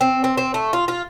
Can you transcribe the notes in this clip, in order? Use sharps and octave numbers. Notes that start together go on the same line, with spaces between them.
C4
C4
C4
A3
F4
F4